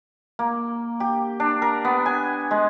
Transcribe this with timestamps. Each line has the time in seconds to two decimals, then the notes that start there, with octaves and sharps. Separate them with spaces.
0.39 A#3
1.00 G4
1.40 D4
1.62 A#4
1.85 B3
2.06 G#5
2.51 G#3